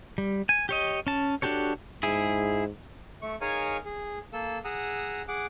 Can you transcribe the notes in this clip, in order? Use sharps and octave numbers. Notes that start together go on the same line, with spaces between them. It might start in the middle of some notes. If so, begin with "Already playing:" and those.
G3
G#5
G4 C#5 D#5
C#4 A5
D4 F#4 G4 A4 C#5
G#2 E4 G#4
A3 C#6
D#4 G#4 A#4 C#5 F5 G#5
G#4
A#3 A4 E6
G#4 F#5 A#5 D#6 E6
G#4 F#5 D6